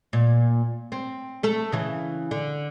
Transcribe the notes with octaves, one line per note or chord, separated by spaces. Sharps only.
A#2
C4
A3 A4
C#3 E3
D3